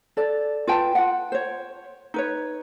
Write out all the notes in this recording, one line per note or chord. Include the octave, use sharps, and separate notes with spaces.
A4 D5
F4 B4 G5 A5
F4 F#5
C5 C#5
D#4 B4 C#5